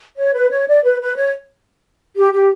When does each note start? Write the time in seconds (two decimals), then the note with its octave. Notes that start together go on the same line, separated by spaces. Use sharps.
0.16 C#5
0.33 B4
0.50 C#5
0.66 D5
0.83 B4
1.00 B4
1.16 C#5
2.15 G4
2.32 G4